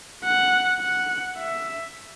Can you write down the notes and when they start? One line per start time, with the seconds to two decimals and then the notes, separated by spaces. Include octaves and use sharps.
0.24 F#5
0.81 F#5
1.38 E5